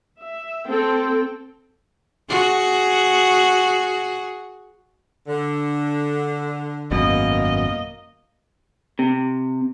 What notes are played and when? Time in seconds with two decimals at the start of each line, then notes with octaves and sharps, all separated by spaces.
0.19 E5
0.68 C4 A4 G5
2.30 F#4 G#4
5.27 D3
6.91 G#1 F#2 B2 A#3 D#5
8.99 C3